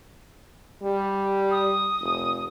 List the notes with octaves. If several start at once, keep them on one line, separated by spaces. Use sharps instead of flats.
G3
D#6
F1